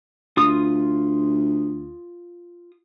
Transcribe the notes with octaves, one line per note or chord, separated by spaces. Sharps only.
D2 F4 D#6